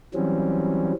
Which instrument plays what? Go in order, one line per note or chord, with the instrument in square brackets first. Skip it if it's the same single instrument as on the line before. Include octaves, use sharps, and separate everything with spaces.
[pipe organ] E3 F#3 G3 C4 C#4